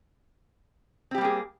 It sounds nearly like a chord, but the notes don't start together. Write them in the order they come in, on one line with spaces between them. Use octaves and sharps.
C4 G4 G3 A#3 G#4